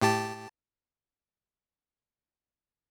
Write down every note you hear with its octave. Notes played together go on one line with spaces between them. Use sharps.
A2 G4 A5